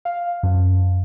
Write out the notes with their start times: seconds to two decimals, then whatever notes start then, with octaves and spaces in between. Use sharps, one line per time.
0.05 F5
0.43 F#2